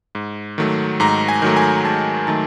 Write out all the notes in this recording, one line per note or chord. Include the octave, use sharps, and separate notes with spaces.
G#2
D#3 F#3 A3
G#2 A#5
G#5
D#3 F#3 A3
G#5
G#2 A5
D#3 F#3 A3 A5